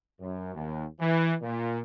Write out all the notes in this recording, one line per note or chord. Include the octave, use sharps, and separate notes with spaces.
F#2
D#2
E3
A#2